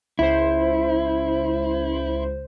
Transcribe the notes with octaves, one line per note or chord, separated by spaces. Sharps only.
C#2 E4 C5